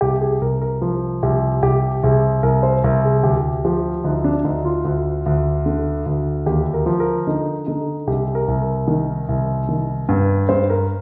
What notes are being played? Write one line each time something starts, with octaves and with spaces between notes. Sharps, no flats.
C2 G4
G#4
C2 A#4
A#4
F3
C2 G4
C2 G4
C2 G#4
C2 A#4
C5
C2 A#4
G#4
D2 G4
F3 G4
D2 D#4
D4
D2 D#4
F4
D2
D2
D3
D2
D#2 G4
A#4
F3
A#4
D3 D#4
D3 D#4
C2 G4
A#4
C2
A#4
D#3
C2
D#3
G2
G2 C5
A#4